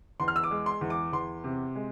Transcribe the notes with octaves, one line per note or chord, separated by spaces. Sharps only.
E2 C6
F6
E6
D6
G#3
C6
E2
D6
E2 C6
C3
G#3